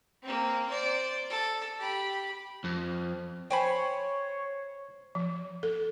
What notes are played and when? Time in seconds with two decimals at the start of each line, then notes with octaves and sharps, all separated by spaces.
0.23 A#3 C4
0.69 C5 D5
1.30 A4
1.80 G4 B5
2.64 F2
3.50 C5 C#5 G5 G#5 B5
5.15 F3
5.63 A4